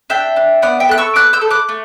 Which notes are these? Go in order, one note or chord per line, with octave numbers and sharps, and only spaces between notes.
D4 E5 G5
D4
B3 D5 F#5
E5 G5
A4 F#6
C#6 E6
B3 D6 F#6
E6 G6
A4
D6 F#6
A3